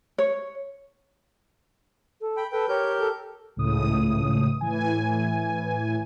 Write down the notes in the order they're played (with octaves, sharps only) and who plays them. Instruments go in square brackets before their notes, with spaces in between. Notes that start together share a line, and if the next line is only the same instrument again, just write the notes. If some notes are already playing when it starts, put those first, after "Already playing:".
[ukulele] C#5
[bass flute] A4
[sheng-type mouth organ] G5 B5
[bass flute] A4 [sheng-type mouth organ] B4 G5
[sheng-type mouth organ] G4 A#4 G6 [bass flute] C#5
[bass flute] A4
[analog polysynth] G#1 C#2 A2 C#3 D#6
A2 E3 G#5